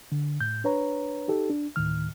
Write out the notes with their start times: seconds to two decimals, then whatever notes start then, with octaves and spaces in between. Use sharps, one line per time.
0.12 D3
0.41 A2 G6
0.64 D4 B4 C#5 A#5
1.28 D#4 G4 A4
1.50 D4
1.76 D2 A2 D#3 F6